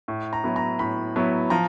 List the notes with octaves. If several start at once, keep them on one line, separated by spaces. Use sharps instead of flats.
A2
A#5
F#3 B3 E4
A#5
A2 B5
F#3 B3 E4
F3 A#5